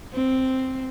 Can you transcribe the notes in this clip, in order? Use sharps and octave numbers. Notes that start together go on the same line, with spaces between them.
C4